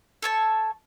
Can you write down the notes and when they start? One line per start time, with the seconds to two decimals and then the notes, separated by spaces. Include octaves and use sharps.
0.22 A4 C#5 A5